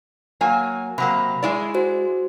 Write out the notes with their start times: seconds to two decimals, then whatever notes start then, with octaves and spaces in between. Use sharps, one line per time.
0.41 F#3 A#3 G#5
0.98 C3 F#3 A#3 B5
1.43 G#3 E4 D5
1.74 F#4 C5